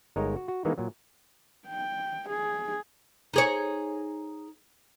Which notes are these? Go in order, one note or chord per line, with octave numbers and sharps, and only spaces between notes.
G1 G#3 D#4 A#4 C#5
F#4
F#4
D#3 E3 G#3 A#3 B3 D#4
A#2 F#3
G5
G#4
D#4 G#4 C#5